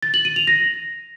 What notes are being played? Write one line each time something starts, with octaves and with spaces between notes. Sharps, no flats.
A6
F#7
D#7
F7
A#6